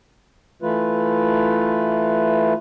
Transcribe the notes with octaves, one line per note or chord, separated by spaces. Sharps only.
E3 A3 F4 B4